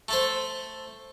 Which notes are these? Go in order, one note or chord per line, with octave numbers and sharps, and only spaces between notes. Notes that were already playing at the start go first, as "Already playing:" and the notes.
A3 A4 C5